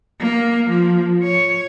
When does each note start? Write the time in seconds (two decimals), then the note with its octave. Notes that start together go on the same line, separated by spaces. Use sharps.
0.21 A#3
0.69 F3
1.23 C#5